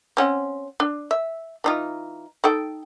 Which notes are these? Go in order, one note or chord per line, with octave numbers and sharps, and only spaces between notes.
C4 C#4 F#5
D4
E5
E3 D#4 F4
D#4 A4 G5